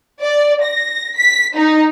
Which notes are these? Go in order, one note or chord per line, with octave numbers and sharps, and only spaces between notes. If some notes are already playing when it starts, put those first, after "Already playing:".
D5
A#6
B6
D#4